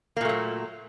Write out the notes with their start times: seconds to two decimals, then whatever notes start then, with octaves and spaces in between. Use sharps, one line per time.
0.17 A#3
0.21 A#2
0.25 A3
0.29 F#3